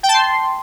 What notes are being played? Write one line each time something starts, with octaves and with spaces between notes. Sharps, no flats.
G5
A5
C6